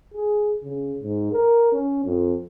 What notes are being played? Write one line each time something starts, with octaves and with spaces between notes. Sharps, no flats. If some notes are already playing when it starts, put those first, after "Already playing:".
G#4
C#3
G#2
A#4
C#4
F2